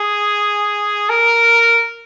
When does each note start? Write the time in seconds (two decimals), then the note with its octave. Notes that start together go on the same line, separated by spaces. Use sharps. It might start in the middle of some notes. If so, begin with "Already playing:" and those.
Already playing: G#4
1.10 A#4